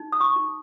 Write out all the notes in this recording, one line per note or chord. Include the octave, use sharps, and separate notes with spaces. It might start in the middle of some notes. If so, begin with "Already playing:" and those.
Already playing: D#4
D#6
C#6
D#4